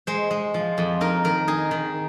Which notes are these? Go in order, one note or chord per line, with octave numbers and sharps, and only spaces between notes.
G#3 C5
G#3
F3
F2
D#4 A#4
D#3 A#4
D#4 G#4
D#3